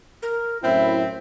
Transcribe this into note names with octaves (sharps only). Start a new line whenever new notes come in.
A#4
F#2 A2 C4 E4 E5